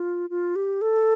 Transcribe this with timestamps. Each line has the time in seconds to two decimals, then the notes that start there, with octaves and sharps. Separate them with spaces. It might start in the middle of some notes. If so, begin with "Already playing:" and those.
Already playing: F4
0.30 F4
0.56 G4
0.81 A4